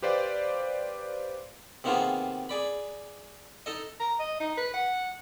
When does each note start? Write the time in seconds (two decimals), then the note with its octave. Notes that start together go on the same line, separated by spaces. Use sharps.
0.02 G4 B4 C5 D5 F5
1.84 C3 D#3 A#3 B3 F4 G#4
2.49 G#4 D5 B5
3.66 D#4 A4 D#5
4.00 A#5
4.20 D#5
4.40 D#4
4.57 B4
4.74 F#5